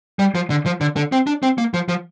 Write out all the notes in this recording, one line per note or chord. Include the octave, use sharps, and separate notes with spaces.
G3
F3
D3
F3
D3
D3
C4
D4
C4
A#3
F3
F3